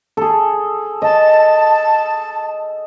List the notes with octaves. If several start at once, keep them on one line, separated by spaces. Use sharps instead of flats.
G#4 A4
D#5 A5